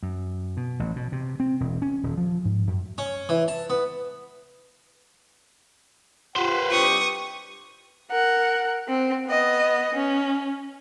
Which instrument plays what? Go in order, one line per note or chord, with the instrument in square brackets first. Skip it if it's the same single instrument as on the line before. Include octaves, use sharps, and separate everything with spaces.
[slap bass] F#2
B2
A1
B2
C3
C4
E1
C#4
D#1
F3
G#2
F#2
[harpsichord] C#4
E3
A5
B3
[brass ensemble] F4 G4 F#5 [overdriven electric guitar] B4 C5
[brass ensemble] C2 G2 G4 [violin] C#6 D#6
[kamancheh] A#4 F#5
C4
B3 D#5
C#4